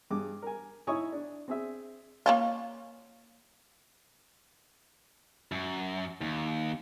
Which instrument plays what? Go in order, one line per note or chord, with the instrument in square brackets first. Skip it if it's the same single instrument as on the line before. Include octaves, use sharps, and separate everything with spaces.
[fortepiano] G2 G#4 D6
A#4 G#5
D#4 E4 C#5 G#5 C#6 D#6
D4
C4 G#4 E5
[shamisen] A#3 C#4 F4
[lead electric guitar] F#2
D#2